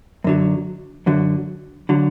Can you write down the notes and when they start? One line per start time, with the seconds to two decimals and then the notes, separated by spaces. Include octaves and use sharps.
0.24 F#2 D3 F#3
1.06 F#2 D3 F#3
1.89 D3 F#3